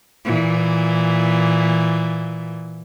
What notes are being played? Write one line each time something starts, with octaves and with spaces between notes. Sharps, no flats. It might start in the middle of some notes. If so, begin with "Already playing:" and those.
A#2 E3